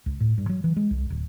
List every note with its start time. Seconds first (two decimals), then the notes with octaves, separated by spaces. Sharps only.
0.06 C#2
0.20 A2
0.38 G2
0.49 F#3
0.64 E3
0.76 G#3
0.91 C2
1.10 D1